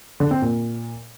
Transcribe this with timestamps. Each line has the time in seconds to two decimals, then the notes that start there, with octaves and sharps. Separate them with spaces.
0.20 D3
0.31 C4
0.42 A#2